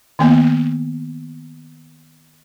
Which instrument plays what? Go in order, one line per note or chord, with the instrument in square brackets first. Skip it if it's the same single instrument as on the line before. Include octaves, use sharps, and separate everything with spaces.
[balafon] D#3 A#3 B3